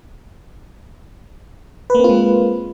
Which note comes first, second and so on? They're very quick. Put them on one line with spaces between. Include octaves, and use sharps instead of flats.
B4 A#3 C4 F4 G#3